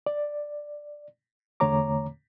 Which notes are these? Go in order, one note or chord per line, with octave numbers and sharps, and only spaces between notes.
D5
E2 D3 A3 C#5 A#5 D6